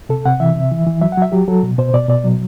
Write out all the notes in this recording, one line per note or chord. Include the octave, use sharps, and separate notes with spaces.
C3 A4
C3 F#5
E3 E5
C3
E3
E3
F#3 E5
F#5
F#3 E5
F#3 G4
F#3 A4
B2
B2 C5
B2 D5
B2 D5
F#3